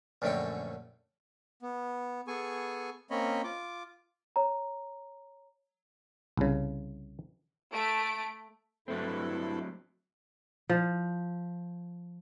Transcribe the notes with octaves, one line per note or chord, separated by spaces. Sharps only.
A#1 F#2 D3 A3 C#4 G5
B3
B3 G#4 A4 G#5 C#6
A#3 C4 C#4 C#5 D#5 B5
F4 D6
C#5 A#5
C2 C#3
A3 D7
G2 F#3 A3 C4 E4 A4
F3